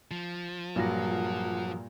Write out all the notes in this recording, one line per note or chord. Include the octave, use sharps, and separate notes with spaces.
F3
G2 A#2 F#3 G3 G#4 A#4 F#5 A#6